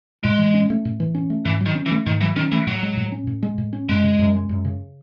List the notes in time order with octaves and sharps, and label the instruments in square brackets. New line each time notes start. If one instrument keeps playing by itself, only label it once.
[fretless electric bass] A2 [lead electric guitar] G#3
[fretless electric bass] E3
C#4
A3
A2
E3
C#4
A3
[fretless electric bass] G#2 [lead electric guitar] E3
[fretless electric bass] F#3
[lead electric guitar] D#3
[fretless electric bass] C#4
[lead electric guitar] E3
[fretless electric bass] A3
[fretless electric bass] G#2 [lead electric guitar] D#3
[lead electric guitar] E3 [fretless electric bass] F#3
[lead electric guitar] D#3 [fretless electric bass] C#4
[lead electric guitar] E3 [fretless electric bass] A3
[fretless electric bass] A2 [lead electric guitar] F#3
[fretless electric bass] G#3
A2
C#4
A2
G#3
A2
C#4
[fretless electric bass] F#2 [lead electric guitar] G#3
[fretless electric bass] C#3
F#2
G#3
F#2
C#3